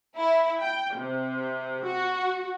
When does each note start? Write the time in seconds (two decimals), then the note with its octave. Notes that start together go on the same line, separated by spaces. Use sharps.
0.16 E4
0.60 G5
0.96 C3
1.84 F#4